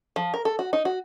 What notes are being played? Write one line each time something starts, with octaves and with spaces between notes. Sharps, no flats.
F3
A#4
A4
F#4
D#4
F#4